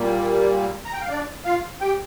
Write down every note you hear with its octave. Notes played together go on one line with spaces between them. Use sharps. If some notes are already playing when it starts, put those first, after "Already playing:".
Already playing: A#2 G3 A#3
A#5
G5
F5
D4 D5
F4 F5
G4 G5